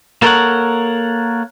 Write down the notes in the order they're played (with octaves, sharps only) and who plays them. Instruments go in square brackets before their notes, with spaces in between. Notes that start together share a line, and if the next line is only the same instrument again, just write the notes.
[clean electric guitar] A#3 A4 A#4 C5 C#5 F#5